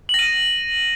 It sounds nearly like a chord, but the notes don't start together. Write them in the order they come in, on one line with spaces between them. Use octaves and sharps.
F#7 A#6 D#7